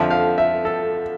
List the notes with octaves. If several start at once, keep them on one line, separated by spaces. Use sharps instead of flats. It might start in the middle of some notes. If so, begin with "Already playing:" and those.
Already playing: F2 D3 F3 E5
F5
E5
A4